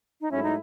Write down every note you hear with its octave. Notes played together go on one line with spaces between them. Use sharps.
D#4
G#2 F#3 A3 C#4 E4
D#4